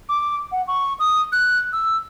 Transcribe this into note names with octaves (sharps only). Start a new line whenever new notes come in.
D6
F#5
C#6
D#6
F#6
E6